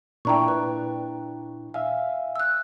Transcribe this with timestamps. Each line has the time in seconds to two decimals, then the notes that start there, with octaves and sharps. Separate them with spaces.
0.25 A#2 D4 E4 G5 A#5 C#6
0.48 B4
1.74 E5 F5 G#5
2.36 E6 F#6